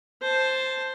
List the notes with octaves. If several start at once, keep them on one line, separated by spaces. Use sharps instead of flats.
C5 A5